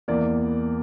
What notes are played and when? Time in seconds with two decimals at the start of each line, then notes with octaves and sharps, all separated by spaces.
0.08 E2 E3 A#3 D5